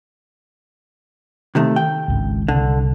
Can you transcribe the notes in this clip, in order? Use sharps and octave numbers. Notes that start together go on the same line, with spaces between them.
C3 D#3 A3
G5
G#1 C#2
C2 D3